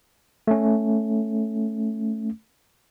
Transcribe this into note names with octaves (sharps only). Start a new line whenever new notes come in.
A3 C#4